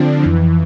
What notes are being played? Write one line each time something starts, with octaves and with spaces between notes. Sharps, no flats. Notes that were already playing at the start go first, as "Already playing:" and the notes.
Already playing: D3 F3 C4 D4
F2 E3